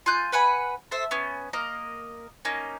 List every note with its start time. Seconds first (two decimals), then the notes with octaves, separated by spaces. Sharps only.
0.06 F4 G#5 F#6 G6
0.32 B4 F#5 G#5 B5
0.91 A4 C5 E5
1.11 B3 C#4
1.53 A#3 A#4 D#5
2.45 A#3 C#4 D#4